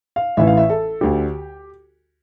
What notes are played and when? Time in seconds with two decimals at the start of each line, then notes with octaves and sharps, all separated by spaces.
0.16 F5
0.37 A1 A2 E3 E5
0.47 F5
0.57 E5
0.70 A4
1.01 D2 D3 G4